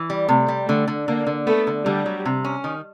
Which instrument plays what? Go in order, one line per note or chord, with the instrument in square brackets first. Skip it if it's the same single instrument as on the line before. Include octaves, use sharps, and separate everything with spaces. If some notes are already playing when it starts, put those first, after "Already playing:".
Already playing: [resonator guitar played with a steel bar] E3
G3
[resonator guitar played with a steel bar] C3 [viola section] A3
[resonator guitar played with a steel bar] G3
[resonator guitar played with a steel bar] D3 [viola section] A3
[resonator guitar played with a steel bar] D3
[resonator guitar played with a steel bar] D3 [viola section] A#3
[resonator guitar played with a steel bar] D3
[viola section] A3 [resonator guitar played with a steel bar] B3
[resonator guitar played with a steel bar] D3
[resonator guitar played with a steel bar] D3 [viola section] G3
[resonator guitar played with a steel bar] F#3
C3
C#4
D#3